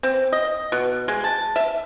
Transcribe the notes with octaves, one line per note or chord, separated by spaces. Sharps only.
C4
D#5
B2
G#3
A5
E5